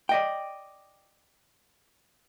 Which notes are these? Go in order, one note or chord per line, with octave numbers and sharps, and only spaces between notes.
D5 D#5 G5